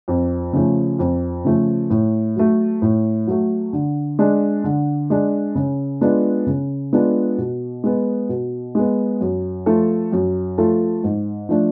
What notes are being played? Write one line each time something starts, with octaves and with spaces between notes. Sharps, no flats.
F2
C#3 F3 A3
F2
C#3 F3 A3
A2
F#3 A3
A2
F#3 A3
D3
G#3 D4
D3
G#3 D4
C#3
G#3 B3 D4 F4
C#3
G#3 B3 D4 F4
B2
G#3 B3
B2
G#3 B3
F#2
F3 A3 F4 A4
F#2
F3 A3 F4 A4
G#2
F3 A3 D4